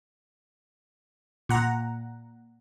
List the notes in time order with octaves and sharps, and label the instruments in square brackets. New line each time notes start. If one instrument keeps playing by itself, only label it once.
[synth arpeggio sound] A#2 F#5 A#5